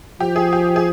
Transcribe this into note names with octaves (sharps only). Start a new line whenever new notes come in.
F3 G4
G#4
G4
G#4